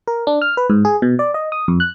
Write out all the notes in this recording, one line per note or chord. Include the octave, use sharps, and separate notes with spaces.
A#4
D4
F6
B4
G#2
G#4
B2
D5
D#5
D#6
F2
F#6